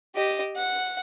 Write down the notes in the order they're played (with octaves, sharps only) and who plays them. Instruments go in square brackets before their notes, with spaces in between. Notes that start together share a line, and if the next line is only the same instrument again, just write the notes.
[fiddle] G4 D#5
F#5